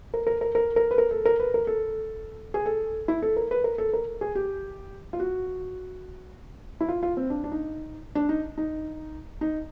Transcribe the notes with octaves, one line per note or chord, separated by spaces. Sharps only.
A#4
A#4
A#4
A#4
A#4
B4
A#4
A4
A#4
B4
A#4
A4
G#4
A4
E4
A4
A#4
B4
A#4
A4
A#4
G#4
G4
F4
F#4
E4
F4
F4
C4
D4
D4
D#4
D4
D#4
D#4
D#4